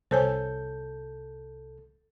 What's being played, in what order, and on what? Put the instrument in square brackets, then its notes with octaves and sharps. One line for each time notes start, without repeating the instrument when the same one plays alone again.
[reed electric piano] C2 A4 G6 [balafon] C5 C#5 G#5